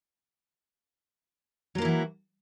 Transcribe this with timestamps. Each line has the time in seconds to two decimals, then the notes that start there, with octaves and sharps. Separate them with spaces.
1.75 F#3
1.78 A#3
1.82 E4
1.85 E3
1.88 F#4